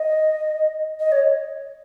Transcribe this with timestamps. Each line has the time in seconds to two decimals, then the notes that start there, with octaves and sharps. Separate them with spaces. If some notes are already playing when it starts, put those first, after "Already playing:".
Already playing: D#5
1.00 D#5
1.12 C#5